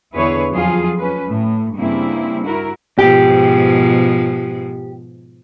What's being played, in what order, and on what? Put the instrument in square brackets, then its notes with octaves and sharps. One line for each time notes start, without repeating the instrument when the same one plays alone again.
[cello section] E2 D3 E4 G#4 B4 C#5
F2 F3 F#3 F4 G#4
C#4 B4
A2
G2 C#3 A#3 C4 E4
E4 F#4 A#4
[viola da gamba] G#2 B2 F3 [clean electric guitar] G4